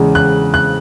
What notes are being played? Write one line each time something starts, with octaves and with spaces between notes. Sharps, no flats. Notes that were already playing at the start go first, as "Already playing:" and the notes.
Already playing: E2 C#3 G#3
F#6
F#6